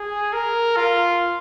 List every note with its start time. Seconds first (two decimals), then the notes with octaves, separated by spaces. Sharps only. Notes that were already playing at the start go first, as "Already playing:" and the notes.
Already playing: G#4
0.33 A#4
0.77 F4